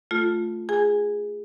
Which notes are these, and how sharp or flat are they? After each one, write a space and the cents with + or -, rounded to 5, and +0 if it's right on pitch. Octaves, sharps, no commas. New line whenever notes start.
A3 +0 F4 +0 A4 +0
G#4 -10 G#5 -5